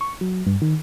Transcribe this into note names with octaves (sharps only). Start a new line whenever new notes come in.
C#6
F#3
G2
D#3